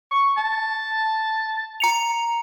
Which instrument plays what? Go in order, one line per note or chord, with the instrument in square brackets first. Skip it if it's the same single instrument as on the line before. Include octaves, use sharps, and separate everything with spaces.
[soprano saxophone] C#6
A5
[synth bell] A#5 C#7 F7